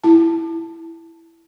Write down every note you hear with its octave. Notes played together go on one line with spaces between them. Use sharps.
E4 A5